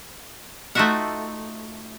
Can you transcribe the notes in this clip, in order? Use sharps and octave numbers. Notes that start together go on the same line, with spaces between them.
A3 D#4 F4 F#4 E5 F#5